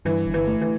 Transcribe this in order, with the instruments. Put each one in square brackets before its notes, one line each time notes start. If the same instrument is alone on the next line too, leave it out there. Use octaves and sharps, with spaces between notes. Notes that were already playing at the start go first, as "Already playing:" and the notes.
[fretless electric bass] G2 [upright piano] E3
[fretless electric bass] G1
[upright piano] E3
[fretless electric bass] A3
[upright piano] E3